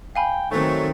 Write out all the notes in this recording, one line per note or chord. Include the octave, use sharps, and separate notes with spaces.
F5 G5 G#5 B5
D#3 F#3 A3 C4 C#5